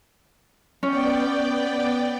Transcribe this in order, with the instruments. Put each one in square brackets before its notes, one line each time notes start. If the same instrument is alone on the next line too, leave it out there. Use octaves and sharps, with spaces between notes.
[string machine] B3 D5 G5 [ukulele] C#4